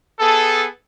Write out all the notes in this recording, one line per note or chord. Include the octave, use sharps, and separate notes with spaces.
B3 G#4 A4